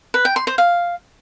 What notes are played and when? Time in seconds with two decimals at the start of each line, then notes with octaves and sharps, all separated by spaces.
0.14 B4
0.25 G5
0.36 C6
0.47 C5
0.58 F5